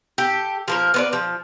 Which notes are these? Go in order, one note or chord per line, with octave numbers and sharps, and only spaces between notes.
G4 A4
F3 A#3 A#4
B3 C5 D5
F3